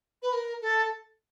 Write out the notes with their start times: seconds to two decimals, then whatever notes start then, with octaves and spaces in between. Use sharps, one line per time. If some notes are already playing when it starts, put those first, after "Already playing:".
0.22 B4
0.33 A#4
0.61 A4